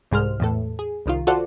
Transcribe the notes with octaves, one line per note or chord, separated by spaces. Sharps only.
C2 G#2 G#3 C5 F6
E2 A2 A4
G#4
C2 D#3 F4
F4 F#4 A4 C5 D5 F#5